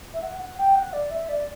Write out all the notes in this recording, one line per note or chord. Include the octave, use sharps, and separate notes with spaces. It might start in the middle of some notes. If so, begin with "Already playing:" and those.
E5
F#5
F#5
G5
F#5
D5
E5
D5